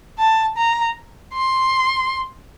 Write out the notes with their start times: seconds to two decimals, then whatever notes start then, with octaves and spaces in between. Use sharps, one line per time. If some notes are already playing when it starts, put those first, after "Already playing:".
0.19 A5
0.57 A#5
1.34 C6